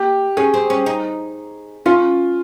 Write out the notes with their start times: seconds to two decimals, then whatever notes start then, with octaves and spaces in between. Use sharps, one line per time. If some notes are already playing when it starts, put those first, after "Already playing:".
Already playing: A#3 G4
0.37 C#4 G#4
0.54 C4
0.70 C#4
0.86 D#4
1.86 C#4 F4